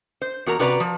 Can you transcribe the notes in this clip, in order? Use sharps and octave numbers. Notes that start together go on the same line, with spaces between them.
C5
E2 F#4 A#4 A#5
C3 F#4 B4 D5 A#5
F3